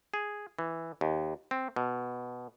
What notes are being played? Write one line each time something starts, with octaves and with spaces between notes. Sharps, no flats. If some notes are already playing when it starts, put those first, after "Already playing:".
G#4
E3
D#2
C4
B2